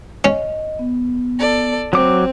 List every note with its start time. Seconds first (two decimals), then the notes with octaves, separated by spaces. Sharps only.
0.25 C#4 D#5
0.79 B3
1.39 A4 D5
1.93 F#3 C4 D6